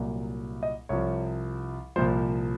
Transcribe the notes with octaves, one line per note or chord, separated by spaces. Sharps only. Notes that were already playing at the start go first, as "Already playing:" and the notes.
Already playing: C2 A#2 F#3
D#5
C2 C3 F3 C#5
C2 A#2 F3 C5